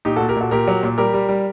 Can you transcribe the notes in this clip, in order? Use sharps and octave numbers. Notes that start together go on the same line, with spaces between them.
A#2 D#4 G4
F#4 A4
A#2
G4 A#4
A#2 F#4 A4
A#2 G4 A#4
F#3
A#2
G3 G4 A#4
G3
G3